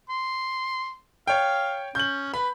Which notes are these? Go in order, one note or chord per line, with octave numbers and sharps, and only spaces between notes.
C6
C#5 F5 G5
C#4 G6 F#7
B4 B5